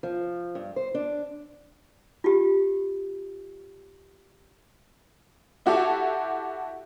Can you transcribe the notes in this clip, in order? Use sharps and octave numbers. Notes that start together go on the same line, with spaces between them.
F3
G2
C5
D4
F4 G4
E4 F#4 G4 A4